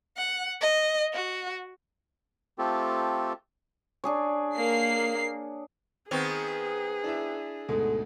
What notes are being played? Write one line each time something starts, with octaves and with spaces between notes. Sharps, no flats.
F#5
D#5
F#4
A3 C4 F4 G4 A4
D4 G#4 C#5
A#3 C7
D#3 B3 C4 G#4 C#6 G#6 F7
D4 E4 E5
D2 G#2 B2 A4